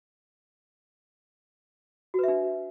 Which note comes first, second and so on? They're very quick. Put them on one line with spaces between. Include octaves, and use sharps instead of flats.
F#4 B4 E5 D4